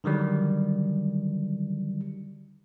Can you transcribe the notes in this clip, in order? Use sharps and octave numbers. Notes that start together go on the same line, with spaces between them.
D3 D#3 F#3 G3